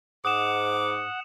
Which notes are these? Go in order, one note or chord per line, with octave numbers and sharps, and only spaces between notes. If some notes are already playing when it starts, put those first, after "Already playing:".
G#2 F#5 D6 D#6 E7